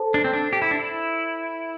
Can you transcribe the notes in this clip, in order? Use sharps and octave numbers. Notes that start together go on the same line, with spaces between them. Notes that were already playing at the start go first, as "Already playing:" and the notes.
Already playing: A4 C5 A5
D4
C4
D4
G4
E4
D4
E4